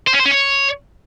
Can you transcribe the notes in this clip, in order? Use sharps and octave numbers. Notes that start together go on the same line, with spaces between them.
C5
C#4
C5
C#4
C#5